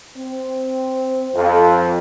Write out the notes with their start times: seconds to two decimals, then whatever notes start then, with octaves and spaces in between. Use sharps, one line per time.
0.16 C4
1.34 F2